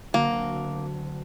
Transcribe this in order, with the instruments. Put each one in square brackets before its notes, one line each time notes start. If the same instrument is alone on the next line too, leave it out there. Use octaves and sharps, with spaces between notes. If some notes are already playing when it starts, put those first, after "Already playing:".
[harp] D2 D3 F#3 C4 F#4 [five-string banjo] A#3